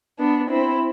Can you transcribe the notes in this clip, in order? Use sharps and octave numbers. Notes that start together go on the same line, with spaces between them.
B3 D4
C4 E4